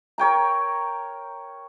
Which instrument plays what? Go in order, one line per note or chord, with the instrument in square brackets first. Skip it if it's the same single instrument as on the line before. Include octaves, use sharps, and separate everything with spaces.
[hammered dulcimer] A#4 C#5 G5 A#5